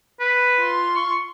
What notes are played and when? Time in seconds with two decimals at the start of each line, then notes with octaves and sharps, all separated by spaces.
0.20 B4
0.58 F4 C6
0.96 C#6